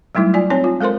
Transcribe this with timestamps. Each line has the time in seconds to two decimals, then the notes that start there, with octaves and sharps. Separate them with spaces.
0.15 F#3 G3 A3 D#4 E4
0.33 A3 F4 D5 G#5
0.50 C4 D#4 C#5 G#5
0.64 F4
0.81 G#3 A4 A#4 C5 C6